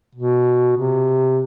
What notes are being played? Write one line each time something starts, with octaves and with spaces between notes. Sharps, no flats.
B2
C3